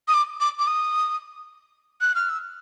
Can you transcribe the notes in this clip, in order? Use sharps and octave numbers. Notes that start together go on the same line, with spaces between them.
D#6
D6
D6
D6
D#6
F#6
F6
E6